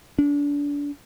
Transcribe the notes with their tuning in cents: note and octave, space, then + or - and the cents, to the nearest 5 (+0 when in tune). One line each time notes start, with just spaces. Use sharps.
D4 -30